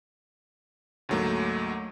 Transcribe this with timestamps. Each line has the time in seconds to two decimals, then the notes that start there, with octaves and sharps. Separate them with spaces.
1.09 D2 G#2 F#3 A3 A#3